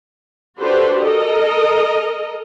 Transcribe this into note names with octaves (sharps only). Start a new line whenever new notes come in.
D4 F#4 G4 A4 B4 C5
A4 A#4 D#5